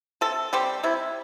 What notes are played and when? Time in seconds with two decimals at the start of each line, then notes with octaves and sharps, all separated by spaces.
0.21 C3 A4
0.53 G3 C4 G4
0.83 C3 E4